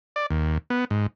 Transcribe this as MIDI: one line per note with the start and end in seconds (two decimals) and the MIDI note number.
0.16 0.26 74
0.30 0.58 39
0.70 0.85 59
0.90 1.07 44